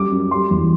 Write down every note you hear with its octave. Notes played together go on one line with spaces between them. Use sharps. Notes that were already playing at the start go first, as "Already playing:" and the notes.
Already playing: F#2 G3 D6
F#2
G3 C6
E2